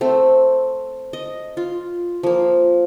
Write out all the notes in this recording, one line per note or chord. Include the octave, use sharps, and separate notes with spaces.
A3 C4
D#5
F4
F3 A#3